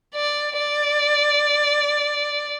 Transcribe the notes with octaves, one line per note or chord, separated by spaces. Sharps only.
D5
D5